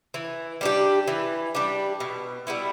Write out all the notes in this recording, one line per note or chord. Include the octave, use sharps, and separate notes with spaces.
E3
G3 D4 G4
E3
G3 D4 G4
B2
G3 B3 E4